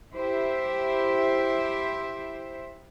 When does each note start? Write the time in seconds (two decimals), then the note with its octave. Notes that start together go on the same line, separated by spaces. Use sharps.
0.14 E4 G4 C5 E5